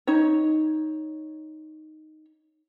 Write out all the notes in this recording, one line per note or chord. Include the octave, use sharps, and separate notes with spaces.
D#4 C#5